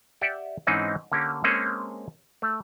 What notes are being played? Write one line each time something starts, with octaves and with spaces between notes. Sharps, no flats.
G4 D5 E5 F#5 G5
G#2 E3 C4 C#4 D#4 G#4
D3 A#3 C#4 G4
G#3 A#3 C4 C#4 G#4 A4
A3